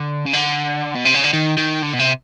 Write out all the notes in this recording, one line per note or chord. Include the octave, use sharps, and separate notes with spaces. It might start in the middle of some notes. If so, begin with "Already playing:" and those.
Already playing: D3
C#3
D3
B2
C3
C#3
D3
D#3
D#3
D3
B2
C3